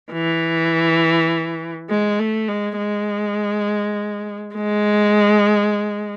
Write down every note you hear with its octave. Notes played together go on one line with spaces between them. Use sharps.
E3
G#3
A3
G#3
G#3
G#3